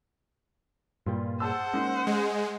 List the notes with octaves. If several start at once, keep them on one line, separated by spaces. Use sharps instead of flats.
G2 A#2 G3 F4
G#4 C5 F#5 A5 E6
G#3 A#3 C#4 D#4
G#3 D#5